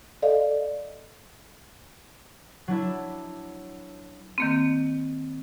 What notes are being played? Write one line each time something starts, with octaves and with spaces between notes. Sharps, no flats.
A4 D5 D#5 F5
F#3 D4 E4
D#3 A#3 C4